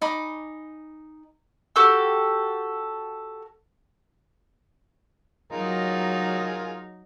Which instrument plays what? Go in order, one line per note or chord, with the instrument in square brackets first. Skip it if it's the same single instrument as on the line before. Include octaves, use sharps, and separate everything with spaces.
[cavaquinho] D#4 G#5 B5 D6
[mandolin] F#4 G4 A4 E6
[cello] F#3 D#4 [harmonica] F4 G#4 A#4